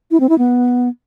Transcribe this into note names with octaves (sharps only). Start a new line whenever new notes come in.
E4
C4
E4
B3